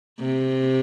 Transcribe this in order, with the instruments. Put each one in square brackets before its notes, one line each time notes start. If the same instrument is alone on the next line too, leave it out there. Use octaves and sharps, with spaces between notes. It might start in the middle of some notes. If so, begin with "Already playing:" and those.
[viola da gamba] C3